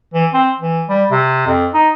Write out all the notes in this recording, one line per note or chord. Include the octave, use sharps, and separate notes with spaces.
E3
C4
E3
G3
C3
F2
D#4